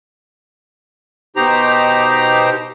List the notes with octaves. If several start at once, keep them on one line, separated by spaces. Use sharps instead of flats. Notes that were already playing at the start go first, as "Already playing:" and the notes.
B2 D#4 G4 C5 A#5